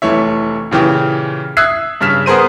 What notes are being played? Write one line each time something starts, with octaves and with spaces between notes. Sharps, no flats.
F1 E3 A3 C#5 E5
A#2 C#3 E3 G4
E5 D#6 E6 F#6 G#6 C7
G2 C#3 F6 B6 E7
B3 G#4 A#4 C5 D#7